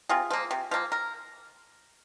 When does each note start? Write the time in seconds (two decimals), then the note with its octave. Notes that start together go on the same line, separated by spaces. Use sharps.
0.09 C3 F4 G#4
0.31 F3 A#3
0.51 C3
0.71 F3 A#3
0.92 A#4